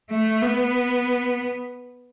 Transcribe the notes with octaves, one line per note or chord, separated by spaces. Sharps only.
A3
B3